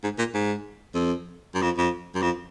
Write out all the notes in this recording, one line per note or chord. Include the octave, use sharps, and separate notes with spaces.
G#2
A#2
G#2
F2
F#2
F2
F2
F#2
F2